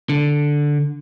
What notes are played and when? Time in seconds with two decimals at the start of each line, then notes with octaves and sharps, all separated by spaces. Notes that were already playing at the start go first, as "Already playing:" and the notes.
0.09 D3